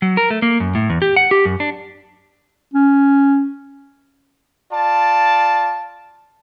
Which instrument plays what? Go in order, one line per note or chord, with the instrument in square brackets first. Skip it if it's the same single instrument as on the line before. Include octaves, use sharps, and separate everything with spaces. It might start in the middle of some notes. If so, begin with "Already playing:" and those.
[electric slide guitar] F#3
A#4
A3
A#3
F#2
A2
E2
G4
F#5
G4
F#2
D4
[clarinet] C#4
[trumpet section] F4 D5 A5